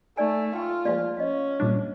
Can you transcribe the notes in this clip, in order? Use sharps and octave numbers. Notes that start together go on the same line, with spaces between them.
A3 D#4 D5 G#5
F4 G5 C#6
F3 G#3 A#3 D5 F5 C6
C#4 D#5 F5
A#2 G3 D4